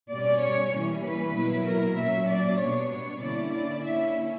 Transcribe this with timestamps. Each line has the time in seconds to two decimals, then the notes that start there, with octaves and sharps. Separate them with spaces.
0.10 B2 G3 C#4 D5
0.41 C#5
0.72 E3 G3 A#3 C#4
1.03 B4
1.35 B2 F#3 A#3 E4
1.66 A#4
1.97 A#2 F#3 C#4 E5
2.29 D5
2.60 B2 G3 B3 D4 C#5
2.91 C#5
3.22 D3 A#3 C#4 E4 D5
3.53 D5
3.85 D3 A#3 C#4 E4 E5